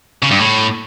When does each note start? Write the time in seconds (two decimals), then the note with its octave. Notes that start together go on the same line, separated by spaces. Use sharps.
0.23 C#3
0.31 G2
0.39 A2